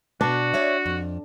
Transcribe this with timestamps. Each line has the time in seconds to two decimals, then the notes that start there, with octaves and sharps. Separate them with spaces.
0.21 B2 B3 D4 F#4 B4
0.54 C#5 D5 E5
0.86 F2